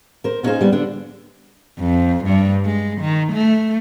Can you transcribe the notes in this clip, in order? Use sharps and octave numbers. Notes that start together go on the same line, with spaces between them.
A#4 C5
B3 C#4 D#4 F4 G#4 C5
G3 B3
D3 D4
F2
G2
G#3
D#3
A3